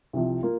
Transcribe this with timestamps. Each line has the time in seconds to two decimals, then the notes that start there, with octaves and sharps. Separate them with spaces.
0.13 C2 C3 F3
0.43 A#3 F4